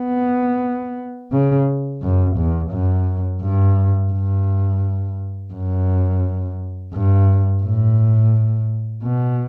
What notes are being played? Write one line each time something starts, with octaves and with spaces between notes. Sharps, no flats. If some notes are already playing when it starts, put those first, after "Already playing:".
Already playing: B3
C#3
F#2
E2
F#2
G2
G2
F#2
G2
A2
B2